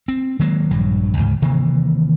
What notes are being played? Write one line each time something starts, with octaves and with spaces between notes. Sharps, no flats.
C4
D#3 F#3 G#3 A#3
A#1 G2 F#3
D2 G#2 C#3
C3 D#3 E3 A#3